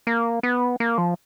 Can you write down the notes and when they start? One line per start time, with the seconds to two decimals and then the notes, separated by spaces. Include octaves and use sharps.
0.07 A#3
0.43 B3
0.80 A#3
0.98 F3